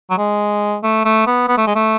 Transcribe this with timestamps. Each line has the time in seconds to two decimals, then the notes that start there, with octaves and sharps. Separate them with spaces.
0.10 F#3
0.18 G#3
0.83 A3
1.05 A3
1.27 B3
1.49 B3
1.58 A3
1.67 G#3
1.76 A3